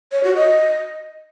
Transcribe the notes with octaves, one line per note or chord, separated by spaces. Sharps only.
C#5
F#4
D#5